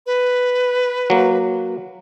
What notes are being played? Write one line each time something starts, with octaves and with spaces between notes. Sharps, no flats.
B4
F#3 A#3